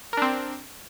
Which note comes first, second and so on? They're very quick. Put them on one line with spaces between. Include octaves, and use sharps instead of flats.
A#4 D4 C4